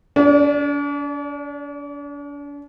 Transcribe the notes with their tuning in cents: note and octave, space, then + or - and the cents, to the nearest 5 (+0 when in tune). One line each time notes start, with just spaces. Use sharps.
D4 -40 D5 +0